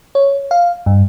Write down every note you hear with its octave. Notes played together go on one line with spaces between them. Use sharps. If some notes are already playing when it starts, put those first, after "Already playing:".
C#5
F5
G2